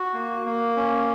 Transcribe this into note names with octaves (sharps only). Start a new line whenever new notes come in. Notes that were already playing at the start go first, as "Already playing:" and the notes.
Already playing: F#4
A#3
A#3
C#4